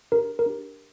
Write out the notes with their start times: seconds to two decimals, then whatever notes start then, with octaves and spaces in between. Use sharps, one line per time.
0.12 D4 G4 A#4
0.39 A#4
0.46 D4 G4